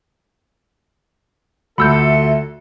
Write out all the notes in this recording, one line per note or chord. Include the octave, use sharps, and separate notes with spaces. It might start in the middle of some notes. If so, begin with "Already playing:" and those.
D2 F4 F#4 A4 E5 B5 E6 G6